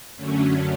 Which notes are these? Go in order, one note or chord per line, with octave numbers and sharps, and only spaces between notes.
F#2 D3 F#3 A3 C#4